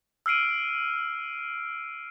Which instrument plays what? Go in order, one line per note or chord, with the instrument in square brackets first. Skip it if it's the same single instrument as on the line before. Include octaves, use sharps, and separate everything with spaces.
[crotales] E6 F6 C7 D7 D#7